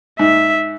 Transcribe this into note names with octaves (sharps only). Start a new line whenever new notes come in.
G#2 E5